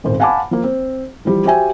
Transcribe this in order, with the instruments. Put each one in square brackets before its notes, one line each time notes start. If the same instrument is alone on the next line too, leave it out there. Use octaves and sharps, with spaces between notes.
[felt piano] D#1 G#1 C5
F5 F#5 G#5 A5 B5 D6
F3 A#3
C4
E3 F3 G3
F#4 G4 C5 E5 G5 G#5